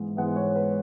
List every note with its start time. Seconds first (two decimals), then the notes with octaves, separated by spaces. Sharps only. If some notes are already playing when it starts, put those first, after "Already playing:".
Already playing: G#2 E3 G#3 B3
0.17 G#2 E3 G#3 B3 F#5
0.36 C#5
0.56 B4